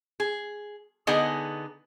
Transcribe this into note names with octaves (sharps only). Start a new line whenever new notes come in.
G#4
D3 B3 D#4 G#4 D#5 G#5